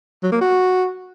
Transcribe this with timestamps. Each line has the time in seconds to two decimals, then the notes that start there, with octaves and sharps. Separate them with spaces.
0.23 F#3
0.32 A#3
0.41 F#4